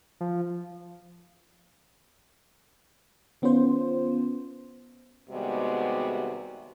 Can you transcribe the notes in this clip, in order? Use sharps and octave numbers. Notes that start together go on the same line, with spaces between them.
F3
D#3 B3 C#4 F4 C5
D#2 C3 G3 G#3 B3 F#4